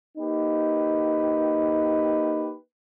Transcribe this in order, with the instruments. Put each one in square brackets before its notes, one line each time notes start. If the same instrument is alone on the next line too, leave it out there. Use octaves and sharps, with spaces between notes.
[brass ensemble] A#3 D#4 G4 B4